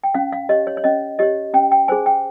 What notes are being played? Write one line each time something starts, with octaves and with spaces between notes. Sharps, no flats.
G5
C#4 F5
F5
G4 C#5 D#5
C#5
C#5
C#4 D#5
G4 C#5 D#5
C#4 G5
G5
G#4 C5 G#5
G5